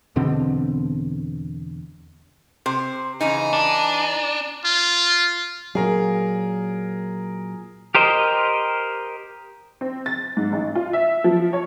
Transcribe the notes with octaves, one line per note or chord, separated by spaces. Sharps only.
E2 B2 D3 C4
C3 C5
C#3 E3 D#4 G#5 A#5
D4
F4
A#2 F#3 G#4 A#4
G4 A#4 C5 D#5
C4
A6
G#2
A1
F4
E5
F3
C#5